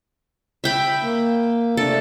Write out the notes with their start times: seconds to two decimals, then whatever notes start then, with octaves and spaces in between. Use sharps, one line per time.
0.64 E5 G5 B5
1.02 A#3
1.77 C3 A3 D4 A4